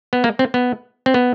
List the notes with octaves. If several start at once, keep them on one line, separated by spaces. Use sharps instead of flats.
B3
A#3
C4
B3
C4
B3